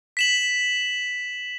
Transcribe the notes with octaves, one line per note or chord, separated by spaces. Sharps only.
B6 E7 F#7